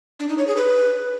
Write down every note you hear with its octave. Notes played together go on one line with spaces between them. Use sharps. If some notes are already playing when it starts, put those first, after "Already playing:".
D4
D#4
C#5
G#4
B4